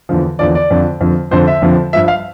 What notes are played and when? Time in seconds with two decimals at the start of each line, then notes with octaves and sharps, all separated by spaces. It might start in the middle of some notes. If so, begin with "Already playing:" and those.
0.09 E2 D3 F3
0.39 E2 D3 F3 D5
0.55 D5
0.71 F2 D3 F3
1.01 F2 D3 F3
1.31 F2 D3 F3 C5
1.47 E5
1.62 F2 D3 F3
1.93 G2 F3 E5
2.08 F5